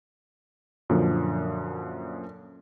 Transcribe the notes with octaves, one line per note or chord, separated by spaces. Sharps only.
F#2 A#2 D3 F3